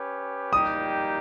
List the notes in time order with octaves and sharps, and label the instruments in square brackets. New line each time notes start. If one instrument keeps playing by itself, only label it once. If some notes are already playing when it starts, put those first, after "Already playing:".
Already playing: [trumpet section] C#4 G4 B4
[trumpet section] G3 A#3 D#4 G4 [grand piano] D#6